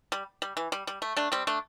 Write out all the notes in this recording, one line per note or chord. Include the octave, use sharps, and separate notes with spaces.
G3
G3
E3
G3
G3
A3
A3 D4
G3 C4
A3 D4